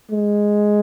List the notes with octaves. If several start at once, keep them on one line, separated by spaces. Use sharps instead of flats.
G#3